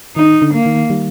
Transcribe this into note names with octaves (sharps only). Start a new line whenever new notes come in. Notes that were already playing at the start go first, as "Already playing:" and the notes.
D#3 D#4
D3
A#3
D#3
D#3 G3